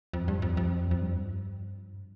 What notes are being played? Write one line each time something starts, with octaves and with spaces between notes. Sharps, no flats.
F2
G2
F2
F2
F2
G2